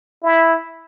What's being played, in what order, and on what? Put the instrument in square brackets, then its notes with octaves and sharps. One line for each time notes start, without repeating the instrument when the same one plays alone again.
[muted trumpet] E4